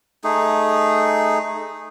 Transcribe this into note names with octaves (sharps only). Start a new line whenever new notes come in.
A3 D#4 G#4